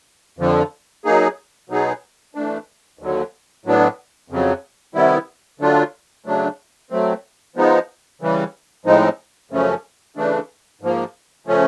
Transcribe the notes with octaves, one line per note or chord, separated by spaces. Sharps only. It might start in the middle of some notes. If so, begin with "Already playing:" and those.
F2 D3 F3
F#3 A#3 D#4 G#4
B2 F#3 B3 D#4 G#4
E3 A3 D4
D#2 D3 F#3
A2 F#3 B3 D4
F2 C#3 F#3
C3 D#3 G3 B3 E4
D3 F#3 A3 D4 F4
C#3 F#3 A3 D4
F#3 A3 C4
F3 G#3 B3 D#4
C#3 E3 G3
A2 F3 G#3 C4 D#4
F#2 C#3 F3 A3 C#4
C#3 E3 A3 D4
G#2 F3 A#3
C#3 F3 A3 C#4